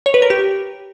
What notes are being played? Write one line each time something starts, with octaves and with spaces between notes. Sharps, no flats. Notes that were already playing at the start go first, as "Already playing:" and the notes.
C#5
B4
A#4
G4